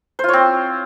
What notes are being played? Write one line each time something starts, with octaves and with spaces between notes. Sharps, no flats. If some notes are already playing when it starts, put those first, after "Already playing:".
C4 F4 C5 C#5